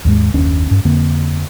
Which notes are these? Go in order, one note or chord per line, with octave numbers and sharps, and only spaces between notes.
D#2 G#2 G#3
F#1 D#2 C#4 D4
G2 C#4
F2 D3 A#3 C4